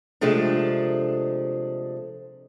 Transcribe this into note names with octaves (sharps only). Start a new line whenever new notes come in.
C3 F3 G#3 A3 D4